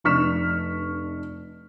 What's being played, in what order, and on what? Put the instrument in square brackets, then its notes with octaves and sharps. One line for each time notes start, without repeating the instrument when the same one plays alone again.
[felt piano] F1 D4 C#6 F6 B6 E7